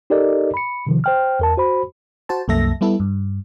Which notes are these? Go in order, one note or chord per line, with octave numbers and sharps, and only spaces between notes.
D#4 G4 A4 A#4 D5 D#5
B5 C#7
C3 D#3 F3
C5 G5 F6
E2 A#4 A5
F#4 C5 B5
F#4 C5 A5
C2 F#2 A#3 A4 E5 A#6
G3 B3 E4 A4
G2